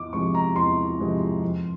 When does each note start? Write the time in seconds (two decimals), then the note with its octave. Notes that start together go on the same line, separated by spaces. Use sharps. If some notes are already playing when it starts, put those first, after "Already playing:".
Already playing: E2 D6
0.13 C3 F3 G#3 C4 C#6
0.35 A#5
0.56 E2 C6
0.99 C3 F3 G#3 C4
1.42 F2